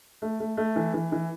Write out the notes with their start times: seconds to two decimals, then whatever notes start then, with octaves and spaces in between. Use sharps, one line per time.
0.22 A3
0.40 A3
0.57 A3
0.76 E3
0.94 E3
1.12 E3